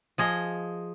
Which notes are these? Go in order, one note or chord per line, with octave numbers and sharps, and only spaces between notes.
F3 G#4 D#5